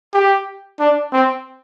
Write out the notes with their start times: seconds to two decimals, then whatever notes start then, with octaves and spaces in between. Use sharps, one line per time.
0.14 G4
0.79 D4
1.12 C4